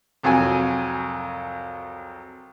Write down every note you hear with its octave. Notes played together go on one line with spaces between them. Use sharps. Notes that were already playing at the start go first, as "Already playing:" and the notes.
C2 F2 F#3 G#5